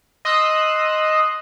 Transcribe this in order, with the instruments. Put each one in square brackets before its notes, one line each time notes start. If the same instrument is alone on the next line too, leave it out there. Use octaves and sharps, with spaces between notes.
[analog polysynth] D#5 C6 D#6 E6 F#6